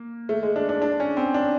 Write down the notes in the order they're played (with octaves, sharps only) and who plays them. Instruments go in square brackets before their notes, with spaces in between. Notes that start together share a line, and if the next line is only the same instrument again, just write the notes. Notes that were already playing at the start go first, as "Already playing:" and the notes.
Already playing: [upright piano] A#3
A3
G#3
D4
D4
D4
C#4
C4
D4